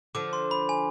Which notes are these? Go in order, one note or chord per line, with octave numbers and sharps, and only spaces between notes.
D3 F3 D6
C6
B5
G#5